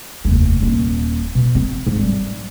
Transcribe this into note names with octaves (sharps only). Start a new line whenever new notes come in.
F1 D#2
D#1 F4
B2
C4
G#2
F#3 G3